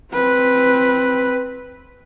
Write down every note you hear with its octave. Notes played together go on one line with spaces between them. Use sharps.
C4 B4